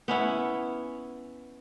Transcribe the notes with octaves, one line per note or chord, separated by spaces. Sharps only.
B3 C#4 E4